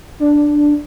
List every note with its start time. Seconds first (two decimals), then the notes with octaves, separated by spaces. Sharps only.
0.20 D4